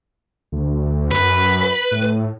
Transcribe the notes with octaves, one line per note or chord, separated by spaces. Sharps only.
D2
F#2 B4
A2